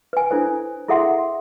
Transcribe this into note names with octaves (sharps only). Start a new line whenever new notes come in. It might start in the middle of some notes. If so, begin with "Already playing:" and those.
B4 G#5
D4 E4 A4 B4 C5
E4 G#4 A4 E5 F#5 C6